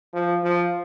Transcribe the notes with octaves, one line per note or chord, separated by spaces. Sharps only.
F3
F3